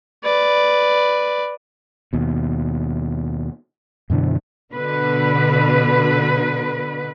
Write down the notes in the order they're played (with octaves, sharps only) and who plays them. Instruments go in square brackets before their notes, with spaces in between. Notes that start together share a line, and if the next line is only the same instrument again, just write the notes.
[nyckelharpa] B4 D5
[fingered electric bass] D#2 B2
F#2 B2 D3 E3
[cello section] B2 D3 B4